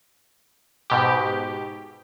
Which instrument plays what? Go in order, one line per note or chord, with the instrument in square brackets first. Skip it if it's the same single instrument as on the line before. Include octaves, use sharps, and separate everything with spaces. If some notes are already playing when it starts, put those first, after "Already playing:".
[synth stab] G#2 B2 G4